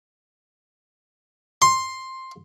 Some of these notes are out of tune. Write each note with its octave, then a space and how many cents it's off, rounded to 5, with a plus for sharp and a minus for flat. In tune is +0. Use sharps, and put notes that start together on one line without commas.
C6 +10